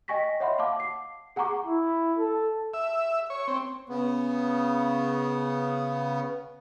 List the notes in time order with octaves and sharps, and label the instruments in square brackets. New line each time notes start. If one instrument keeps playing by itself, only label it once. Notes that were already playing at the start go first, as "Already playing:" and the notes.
[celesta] D#5 G5 G#5 C#6 A#6 B6
C#5 D#5 E5 F#5 B5 C6
F5 F#5 A5 D6
D6 C7
G#4 F#5 G#5 A#5 C#6 D6
[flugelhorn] E4
A4
[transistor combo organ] E5
C#5
C4
[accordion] C#3 B3